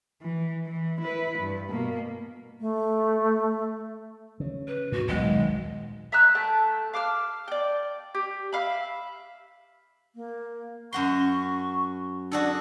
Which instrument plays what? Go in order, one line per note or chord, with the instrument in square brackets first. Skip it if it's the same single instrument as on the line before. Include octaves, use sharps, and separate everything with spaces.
[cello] E3
E3
E4 B4
G2
B2 A#3
[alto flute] A3
[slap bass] C#3
[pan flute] B4
[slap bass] G#2 [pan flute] F#4
[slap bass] D#1 B1 D#3 [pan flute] G#3
[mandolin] E5 A#5 E6 F#6
A3 G5 A5
F5 D6 E6 F6
D5 G5
G4
E5 F5 B5
[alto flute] A#3
[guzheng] F#2 F#4 C6 [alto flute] C#6
[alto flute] D4 [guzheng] F#4 G#4 A4